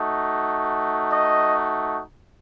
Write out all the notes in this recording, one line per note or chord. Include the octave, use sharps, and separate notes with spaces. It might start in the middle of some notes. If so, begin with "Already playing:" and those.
Already playing: A3 D#4 F#4
D#5